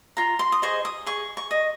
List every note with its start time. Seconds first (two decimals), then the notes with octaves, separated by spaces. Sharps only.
0.17 F4 A#5
0.39 C6
0.52 D#6
0.62 G#4 C5 D#5 C#6
0.85 D#6
1.06 G#4 C#6
1.37 C#6
1.51 D#5